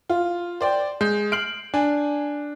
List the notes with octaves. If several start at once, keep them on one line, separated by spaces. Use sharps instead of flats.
F4
C5 D5 G5
G#3 G6
F6 C7 D7 F#7
D4 G#5